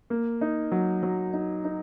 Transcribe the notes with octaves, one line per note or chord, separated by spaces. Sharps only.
A#3
D#4
F#3
F#3
D#4
D#4